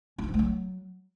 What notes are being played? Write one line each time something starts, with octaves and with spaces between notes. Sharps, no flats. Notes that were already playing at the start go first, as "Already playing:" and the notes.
C#4
D#4
F3
A3
F#3